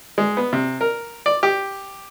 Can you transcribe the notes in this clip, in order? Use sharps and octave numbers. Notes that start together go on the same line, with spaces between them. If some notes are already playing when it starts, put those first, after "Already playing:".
G#3
B3
C3
A#4
D5
G4